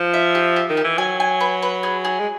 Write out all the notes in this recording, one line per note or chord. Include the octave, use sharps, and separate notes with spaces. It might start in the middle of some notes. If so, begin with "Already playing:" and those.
Already playing: F3
E5
G4
G4
D#3
G4
E3
F#3 G#5
G#5
B4
B4
G#4
G#4
G#3